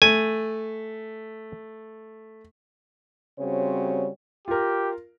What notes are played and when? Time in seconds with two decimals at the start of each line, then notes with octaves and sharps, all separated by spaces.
0.02 A3 G#5
3.39 C#3 G3 C4 F#4 C5 C#5
4.48 F4 G4 A#4